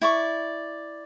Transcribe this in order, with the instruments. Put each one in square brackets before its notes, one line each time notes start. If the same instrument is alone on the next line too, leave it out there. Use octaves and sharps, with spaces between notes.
[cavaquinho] E4 D5 C#6